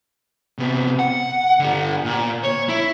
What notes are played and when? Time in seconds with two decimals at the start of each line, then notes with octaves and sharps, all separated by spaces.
0.58 C3 B3
0.99 F#5
1.59 D3 G4
2.05 A#2
2.44 C#5
2.69 E4